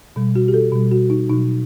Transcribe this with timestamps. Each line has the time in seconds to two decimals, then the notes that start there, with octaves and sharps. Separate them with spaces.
0.16 B2 G3
0.36 F#4
0.48 G4
0.54 A4
0.72 B2 G3
0.92 F#4
1.10 D#4
1.29 B2 D#4
1.33 F#3